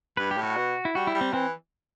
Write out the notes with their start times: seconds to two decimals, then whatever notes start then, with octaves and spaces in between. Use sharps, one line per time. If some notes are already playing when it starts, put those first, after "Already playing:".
0.17 G2 B4
0.31 G4
0.37 A2
0.43 F#4
0.56 B2
0.85 E4
0.95 G3 F#4
1.07 E4
1.14 G3
1.21 C4
1.33 E3 C4